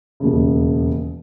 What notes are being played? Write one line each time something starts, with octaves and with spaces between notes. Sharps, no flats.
E1 D#2 C#3